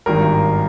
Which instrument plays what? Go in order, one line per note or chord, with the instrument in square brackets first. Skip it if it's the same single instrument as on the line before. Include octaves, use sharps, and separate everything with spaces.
[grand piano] G#1 G2 D#3 A#4